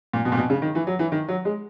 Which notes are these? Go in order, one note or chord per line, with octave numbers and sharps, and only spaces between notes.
A#2
B2
A#2
B2
C#3
D#3
E3
F#3
E3
D#3
F#3
G#3